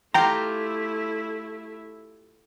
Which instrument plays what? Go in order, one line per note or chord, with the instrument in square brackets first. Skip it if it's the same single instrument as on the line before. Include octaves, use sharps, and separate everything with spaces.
[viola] A3 E4 [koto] F4 G4 F5 [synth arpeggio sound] G5 A#5